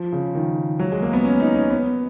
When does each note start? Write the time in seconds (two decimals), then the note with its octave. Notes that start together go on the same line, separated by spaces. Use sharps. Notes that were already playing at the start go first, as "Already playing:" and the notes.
Already playing: F3
0.12 C#3
0.35 D#3
0.79 F#3
0.92 G#3
1.02 A#3
1.13 B3
1.25 C#4
1.40 D#4
1.55 C#4
1.70 B3